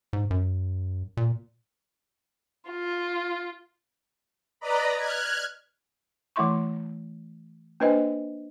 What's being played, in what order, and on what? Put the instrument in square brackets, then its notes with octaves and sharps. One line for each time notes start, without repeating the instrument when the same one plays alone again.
[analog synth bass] G#2
F#2
A#2
[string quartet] F4
[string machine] B4 D5 D#5 A#5 B5
F6 F#6 G#6
[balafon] E3 A3 E4 E5 C6 C#6
A#3 D4 B4 C5 D#5 G#5